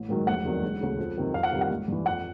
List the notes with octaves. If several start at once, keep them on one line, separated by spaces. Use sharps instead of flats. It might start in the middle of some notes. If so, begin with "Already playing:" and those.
Already playing: A1
G#2 D#3 F#3
F1 F#5
E2 C3 D#3 F#3
E1
D2 C#3
F2
C3 D#3 F#3
F2 F5
F#5
C3 D#3 G3
F#5
G#1
G2 E3
F2 F#5